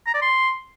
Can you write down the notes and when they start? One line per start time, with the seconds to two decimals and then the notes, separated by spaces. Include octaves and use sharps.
0.07 A#5
0.14 D5
0.22 C6